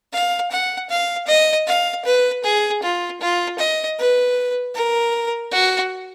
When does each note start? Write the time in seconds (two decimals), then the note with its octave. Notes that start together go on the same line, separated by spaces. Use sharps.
0.13 F5
0.51 F#5
0.90 F5
1.28 D#5
1.67 F5
2.05 B4
2.44 G#4
2.83 F4
3.21 F4
3.59 D#5
3.98 B4
4.75 A#4
5.52 F#4